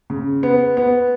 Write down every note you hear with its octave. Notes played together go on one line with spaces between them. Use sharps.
C#3
B3
B3